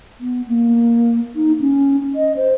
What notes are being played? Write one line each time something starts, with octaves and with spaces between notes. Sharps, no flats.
B3
A#3
D#4
C#4
D#5
C5